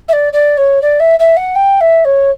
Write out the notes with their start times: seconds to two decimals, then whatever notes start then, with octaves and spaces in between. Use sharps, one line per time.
0.08 E5
0.13 D5
0.33 D5
0.57 C#5
0.81 D5
1.00 E5
1.19 E5
1.37 F#5
1.55 G5
1.80 E5
2.05 C#5